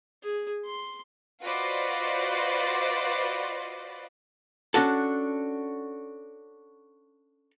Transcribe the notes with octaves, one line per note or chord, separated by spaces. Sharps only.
G#4
C6
F4 F#4 B4 C5 D5 D#5
C#4 D4 F#4 A4